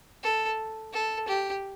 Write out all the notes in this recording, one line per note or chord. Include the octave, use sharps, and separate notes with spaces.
A4
A4
G4